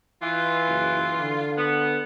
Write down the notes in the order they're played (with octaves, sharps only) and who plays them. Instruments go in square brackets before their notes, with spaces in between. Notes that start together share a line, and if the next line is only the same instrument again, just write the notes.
[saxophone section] E3 [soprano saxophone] F4
[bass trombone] F#1
D3
[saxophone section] B3